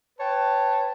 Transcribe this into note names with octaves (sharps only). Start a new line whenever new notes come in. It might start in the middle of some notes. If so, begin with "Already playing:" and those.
B4 C#5 G5 A5